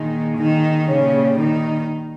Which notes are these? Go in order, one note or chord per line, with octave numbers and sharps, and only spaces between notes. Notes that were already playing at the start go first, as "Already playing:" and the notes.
Already playing: A#2 D#3 G#3 D#4
D#3 D#4
A#2 C#3 G3 C#4
D#3 D#4